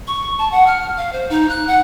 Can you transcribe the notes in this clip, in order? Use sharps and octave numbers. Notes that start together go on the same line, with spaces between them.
C#6
A5
F#5
F6
F5
C5
D#4
F#6
F#5